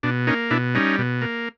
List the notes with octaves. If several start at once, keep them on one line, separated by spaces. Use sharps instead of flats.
B2 D4
A#3 C#4 D#4
B2 D4 E4
G3 C#4 D#4
B2
A#3